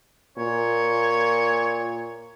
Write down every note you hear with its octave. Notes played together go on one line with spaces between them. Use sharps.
A#2 C#5